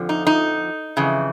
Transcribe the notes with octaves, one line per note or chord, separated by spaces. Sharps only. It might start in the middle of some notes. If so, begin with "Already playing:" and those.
Already playing: F2 D3 F3
D#4
D#4
F2 C#3 E3